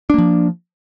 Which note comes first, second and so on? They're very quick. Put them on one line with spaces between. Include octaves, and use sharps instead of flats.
D4 A#3 F3